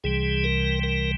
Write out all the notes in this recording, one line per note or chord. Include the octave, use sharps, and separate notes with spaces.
C2 C3 E3 G3 G#4
A#4
A#4